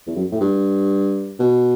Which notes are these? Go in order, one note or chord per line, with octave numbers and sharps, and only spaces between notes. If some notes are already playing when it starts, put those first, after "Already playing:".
E2
F#2
A2
G2
B2